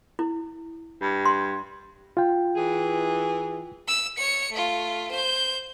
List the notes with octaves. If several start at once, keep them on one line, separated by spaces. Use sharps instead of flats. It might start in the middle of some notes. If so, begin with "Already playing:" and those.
E4
G2
C6
F4 G5
E3 G#4
E6
C#5 C#7
A3 F4
C5 G6